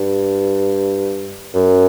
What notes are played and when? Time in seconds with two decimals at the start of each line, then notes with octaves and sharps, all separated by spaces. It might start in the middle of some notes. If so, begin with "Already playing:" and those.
Already playing: G2
1.54 F#2